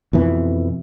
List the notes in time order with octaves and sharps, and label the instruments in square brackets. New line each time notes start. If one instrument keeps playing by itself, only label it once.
[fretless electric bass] F2 B2 E3